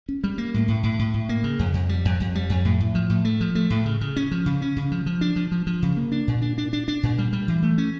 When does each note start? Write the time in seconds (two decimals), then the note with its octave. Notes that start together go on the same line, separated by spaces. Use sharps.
0.09 C#4
0.24 G3
0.38 A#3
0.54 A2
0.68 A2
0.83 A2
0.99 A2
1.14 A2
1.29 A#3
1.44 C#3
1.59 F2
1.74 F2
1.89 G3
2.05 F2
2.20 F2
2.35 G3
2.50 F2
2.65 A2
2.81 A2
2.95 F3
3.10 A2
3.25 A3
3.41 F3
3.55 A3
3.70 A2
3.86 C#3
4.01 C#3
4.16 C#4
4.31 F3
4.46 C#3
4.62 C#4
4.76 C#3
4.92 F3
5.06 F3
5.21 D4
5.36 F3
5.52 F3
5.67 F3
5.82 C#3
5.97 A#3
6.12 D4
6.27 A#2
6.42 D4
6.58 D4
6.73 D4
6.88 D4
7.03 A#2
7.18 G3
7.33 G3
7.48 E3
7.63 A3
7.78 C#4